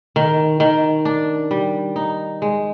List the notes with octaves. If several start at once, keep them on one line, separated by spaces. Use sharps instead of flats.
D#3
D#3
D4
G3
D#4
G#3